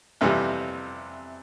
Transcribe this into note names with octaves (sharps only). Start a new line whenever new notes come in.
F2 C3 E3 G3